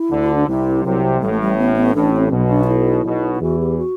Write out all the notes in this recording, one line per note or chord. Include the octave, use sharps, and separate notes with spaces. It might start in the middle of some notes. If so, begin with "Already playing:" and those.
Already playing: E4
D2 D3
D4
C2 C3 E4
C2 C3 F#3
A1 A2 G3
A3
G3
B3
B3
A1 A2 D4
C4
B1 B2
D4
F#4
E4
B1 B2
E4
E2 E3 F#4
G4
F#4